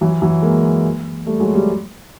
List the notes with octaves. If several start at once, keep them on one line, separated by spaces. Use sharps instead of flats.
E3 F#3
E3 F#3
G#3 A#3
G3 A3
F#3 G#3
G3 A3